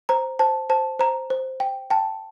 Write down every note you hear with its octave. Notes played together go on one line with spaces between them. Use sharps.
C5 A#5
C5 A5
C5 A5
C5 A#5
C5
G5
G5 A5